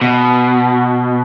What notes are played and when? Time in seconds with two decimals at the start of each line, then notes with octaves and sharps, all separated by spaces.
0.02 B2